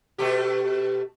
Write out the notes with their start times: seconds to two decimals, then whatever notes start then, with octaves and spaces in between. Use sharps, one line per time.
0.18 B2 A3 G4